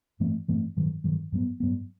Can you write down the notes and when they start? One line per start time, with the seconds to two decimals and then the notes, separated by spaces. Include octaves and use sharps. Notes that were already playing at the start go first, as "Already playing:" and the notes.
0.20 G2 E3 A3 C4
0.48 G2 E3 A3 C4
0.77 G2 D#3 F#3
1.04 G2 D#3 F#3
1.32 G2 F#3 B3
1.60 G2 F#3 B3